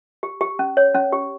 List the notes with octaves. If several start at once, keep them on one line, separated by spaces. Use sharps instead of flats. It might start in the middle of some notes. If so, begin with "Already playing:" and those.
G4
G4
C#4
C#5
C#4
G4